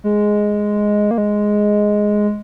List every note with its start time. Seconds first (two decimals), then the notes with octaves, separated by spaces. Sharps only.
0.04 G#3
1.11 A#3
1.18 G#3